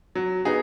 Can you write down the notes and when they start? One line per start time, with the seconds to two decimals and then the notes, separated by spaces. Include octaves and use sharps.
0.15 F#3
0.45 B3 D#4 G#4